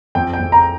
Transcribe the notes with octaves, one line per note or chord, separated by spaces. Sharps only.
F2 G5
G5
F2
A#5